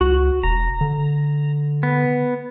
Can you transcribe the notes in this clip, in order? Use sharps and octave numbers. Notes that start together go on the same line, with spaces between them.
C#2 F#4
E1 A#5
D3
B3